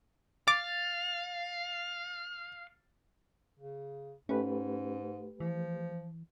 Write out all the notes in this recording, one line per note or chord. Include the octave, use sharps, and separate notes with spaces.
F5 D6 A6
C#3
G#2 A3 C#4 G4 B4
E3 F3